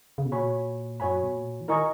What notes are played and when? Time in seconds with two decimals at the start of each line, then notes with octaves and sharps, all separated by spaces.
0.18 C#3
0.26 B2
0.32 A#2 F#4 C#5 G#5 B5
1.00 F#2 F#4 C#5 G#5 B5
1.23 B2
1.34 A#2
1.61 E3
1.68 D#3 E4 A#4 D#5 G#5 C#6